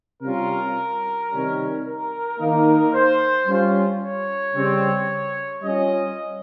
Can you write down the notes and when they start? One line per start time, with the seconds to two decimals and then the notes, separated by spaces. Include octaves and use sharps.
0.22 C3 G3 C#4 F4 A#4
1.31 C3 D#3 G3 C#4
1.84 A#4
2.39 D#3 A#3 D#4
2.92 C5
3.47 G3 C#4 F4
4.01 C#5
4.55 C#3 G3 C4
5.62 G3 C#4 F4 D#5